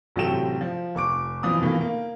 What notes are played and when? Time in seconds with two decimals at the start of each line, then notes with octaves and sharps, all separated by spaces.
0.16 A1 C3 F#3 A4 G5 E7
0.61 F3
0.95 F1 C#6 D6 D7
1.43 B1 E3 F3 D#6
1.60 B2 D#3 E3 A3 A#3
1.81 A#3